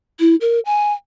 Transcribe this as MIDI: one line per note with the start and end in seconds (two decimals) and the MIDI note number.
0.20 0.36 64
0.41 0.60 70
0.66 0.93 80